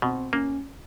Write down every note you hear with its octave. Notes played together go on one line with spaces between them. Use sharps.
B2 C4
A#3 C#4